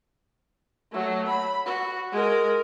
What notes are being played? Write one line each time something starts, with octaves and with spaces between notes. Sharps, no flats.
F#3 A3
B5
F#4
G#3 A#4